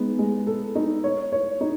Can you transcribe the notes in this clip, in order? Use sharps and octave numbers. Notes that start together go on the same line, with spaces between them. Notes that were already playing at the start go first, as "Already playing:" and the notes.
Already playing: G#3 B3 D#4
G#3
A4
D#4
C#5
C#5
D#4